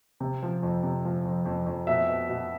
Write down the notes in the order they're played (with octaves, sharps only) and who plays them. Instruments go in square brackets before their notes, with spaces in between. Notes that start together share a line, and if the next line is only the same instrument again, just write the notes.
[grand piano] C3
F3
F2
C3
F3
F2
F2
F2
[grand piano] B2 [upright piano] E5
[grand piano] B2
B2